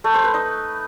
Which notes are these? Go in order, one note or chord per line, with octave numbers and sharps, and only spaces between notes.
A3
C5
B4
D#4